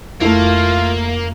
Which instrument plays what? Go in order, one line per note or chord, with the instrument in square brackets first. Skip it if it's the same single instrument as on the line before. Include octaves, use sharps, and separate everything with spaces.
[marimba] F2 [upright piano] A3 E4 [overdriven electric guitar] A#3 [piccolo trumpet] F4